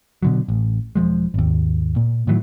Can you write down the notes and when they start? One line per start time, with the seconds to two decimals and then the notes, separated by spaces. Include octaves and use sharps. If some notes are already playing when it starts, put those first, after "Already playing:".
0.23 B2 D3 F#3
0.48 A1
0.95 E1 F3 G#3
1.34 G#1 D#2
1.96 A#2
2.27 A2 D#3 E3 F#3